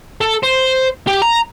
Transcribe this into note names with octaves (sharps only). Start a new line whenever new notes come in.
A4
C5
G4
A#5